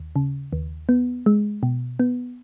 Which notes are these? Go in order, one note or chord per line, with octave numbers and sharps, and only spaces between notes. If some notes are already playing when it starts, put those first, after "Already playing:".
Already playing: D#2
C#3
D#2
B3
G#3
B2
B3